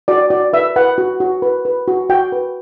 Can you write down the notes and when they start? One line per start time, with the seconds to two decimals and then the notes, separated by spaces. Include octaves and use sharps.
0.08 F#4 D5
0.30 F#4 D5
0.53 B4 E5
0.76 B4 F#5
0.98 F#4
1.20 F#4
1.42 B4
1.65 B4
1.88 F#4
2.09 F#4 G5
2.32 B4